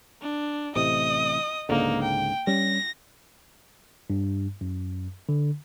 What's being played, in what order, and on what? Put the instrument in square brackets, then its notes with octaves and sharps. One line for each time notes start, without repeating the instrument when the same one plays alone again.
[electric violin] D4
[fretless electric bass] A1 A2 C3 [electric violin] D#5 D#6
[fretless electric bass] C#2 G#2 D3 [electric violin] A#3 D#4
[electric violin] G5
[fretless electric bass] G3 C#4 [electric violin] A#6
[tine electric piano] G2
F#2
D3